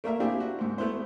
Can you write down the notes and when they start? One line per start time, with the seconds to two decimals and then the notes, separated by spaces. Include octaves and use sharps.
0.04 A3 A#3 A#4 E5
0.20 A#3 C4 D4 E4 G4 G#4
0.40 F#4
0.59 G#2 C4
0.78 A3 B3 E4 C5